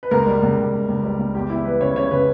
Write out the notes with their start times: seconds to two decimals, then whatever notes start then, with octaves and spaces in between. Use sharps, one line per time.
0.03 B4
0.11 C#2 A#4
0.27 G3
0.42 C#2
0.57 C#2
0.73 C#2
0.88 C#2
1.04 G3
1.19 C#2
1.34 E2 G4
1.50 E2 E4
1.65 G3 B4
1.80 C#3 C#5
1.96 C#3 C#5
2.11 C#3 B4